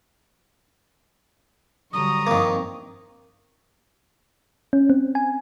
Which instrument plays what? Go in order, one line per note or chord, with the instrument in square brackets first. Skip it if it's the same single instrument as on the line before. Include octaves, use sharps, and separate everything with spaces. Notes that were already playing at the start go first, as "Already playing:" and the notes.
[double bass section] D3 F#3 G3 [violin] A#5 C#6 [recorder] D#6
[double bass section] G2 F3 C4 [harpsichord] D#3 A#3
[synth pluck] C#4
C4
G#5